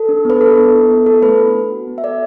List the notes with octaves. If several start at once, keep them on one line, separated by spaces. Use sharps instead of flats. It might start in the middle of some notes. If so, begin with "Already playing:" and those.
Already playing: A4
D4
B3 B4
D4 A4
B3
E4
B3
E4 A4
A3 B4
D4
B3
F#4
B3
E5
A4 D5